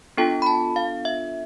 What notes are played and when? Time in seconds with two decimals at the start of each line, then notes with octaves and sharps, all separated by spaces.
0.17 B3 D4 F4 A4 G5
0.42 B5
0.46 A5
0.76 F5
1.05 E5